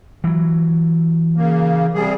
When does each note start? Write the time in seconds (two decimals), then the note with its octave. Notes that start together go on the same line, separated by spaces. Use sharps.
0.24 E3 F#3
1.36 C#3 A#3
1.94 C3 G3 G#4